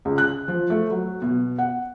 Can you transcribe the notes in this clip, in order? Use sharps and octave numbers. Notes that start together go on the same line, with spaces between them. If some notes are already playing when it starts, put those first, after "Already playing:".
C#2
F#6
F3
A3
F#3
B2
F#5